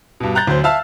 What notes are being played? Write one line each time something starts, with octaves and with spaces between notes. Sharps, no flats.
G2 B2
A#5 F#6 G6 A6
D2 F#3 C5 G6
E5 F5 A5 E6 F6